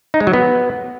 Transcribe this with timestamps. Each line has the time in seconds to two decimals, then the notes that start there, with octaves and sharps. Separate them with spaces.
0.14 D#4
0.20 G#3
0.27 F#3
0.33 B3